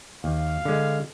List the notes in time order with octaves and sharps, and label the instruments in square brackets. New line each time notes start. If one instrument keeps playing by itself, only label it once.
[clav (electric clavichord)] D#2 [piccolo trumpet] F5
[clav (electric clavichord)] D3 G#3